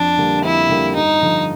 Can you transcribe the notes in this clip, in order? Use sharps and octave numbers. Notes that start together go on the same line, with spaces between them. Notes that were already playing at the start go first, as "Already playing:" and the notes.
Already playing: F2 D4
D3 G3 A#3
F2 E4
D3 G3 A#3
G2 D#4
D3 F3